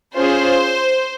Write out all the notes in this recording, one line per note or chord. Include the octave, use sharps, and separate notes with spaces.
C#4 F4 G#4 C5